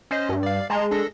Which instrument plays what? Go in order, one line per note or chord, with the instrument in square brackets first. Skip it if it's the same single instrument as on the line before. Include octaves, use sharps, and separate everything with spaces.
[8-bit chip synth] C#4 D#5 [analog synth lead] C5
[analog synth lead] G2
[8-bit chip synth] D5 F5
[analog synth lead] G#3 [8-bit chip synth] A5 A#5 C6
[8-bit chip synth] D4 A4 A#6